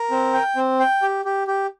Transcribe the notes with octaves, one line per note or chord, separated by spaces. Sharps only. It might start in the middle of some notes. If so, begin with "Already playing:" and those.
Already playing: A#4
C4
G5
C4
G5
G4
G4
G4